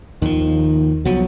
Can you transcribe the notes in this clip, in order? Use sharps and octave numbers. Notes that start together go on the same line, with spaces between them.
D#2 D#3 F3
C2 F3 F#3 B3